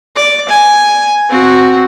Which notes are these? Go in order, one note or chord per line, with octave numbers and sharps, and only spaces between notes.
D5
G#5
C4 F#4